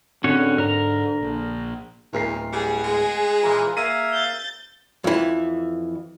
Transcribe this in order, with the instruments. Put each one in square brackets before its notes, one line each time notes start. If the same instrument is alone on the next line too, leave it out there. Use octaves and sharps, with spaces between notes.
[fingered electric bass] A2 C4 [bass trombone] D3 [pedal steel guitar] C#4 F#4 C#5
[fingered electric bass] G#2 [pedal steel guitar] A#4 A#5
[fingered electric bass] A#1
[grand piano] D1 A#4 C7 [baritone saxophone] E2
[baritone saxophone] G3 [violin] G#4 [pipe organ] F#5
[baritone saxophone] G#3
[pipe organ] A#2 E3 [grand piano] A#5
[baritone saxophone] A#3 [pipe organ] E5 F5 G#6 [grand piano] D#7
[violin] G6 A6
[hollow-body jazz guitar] F2 E3